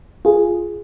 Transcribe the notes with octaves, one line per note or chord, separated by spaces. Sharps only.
F4 G#4